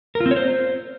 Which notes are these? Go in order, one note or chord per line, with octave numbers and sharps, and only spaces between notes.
A#4
F4
C4
C#5
C5